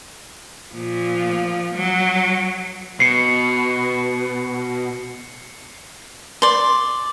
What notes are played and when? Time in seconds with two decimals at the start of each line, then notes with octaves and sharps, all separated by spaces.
0.74 A#2 F3
1.75 F#3
3.00 B2 C7 C#7
6.42 D5 C6